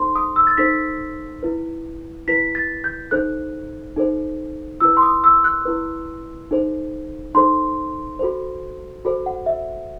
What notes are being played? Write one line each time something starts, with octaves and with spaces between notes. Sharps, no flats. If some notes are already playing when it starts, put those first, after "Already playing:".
Already playing: D#4 A4 C5 C6
D#6
E6
A6
D#4 A4 C5 B6
E4 B4
E4 B4 B6
A6
G6
D#4 A4 C5 F#6
D#4 A4 C5
E4 B4 E6
C6
D#6
E6
F#6
E4 B4
D#4 A4 C5
D#4 A4 C5 C6
F#4 A4 C5
F#4 A4 C5
F#5
E5